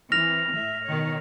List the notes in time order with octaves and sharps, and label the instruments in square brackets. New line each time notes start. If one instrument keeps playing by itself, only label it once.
[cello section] E3 C4 [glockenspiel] F6 A#6 F7
[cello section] A2 E5
B2 D#3 C#5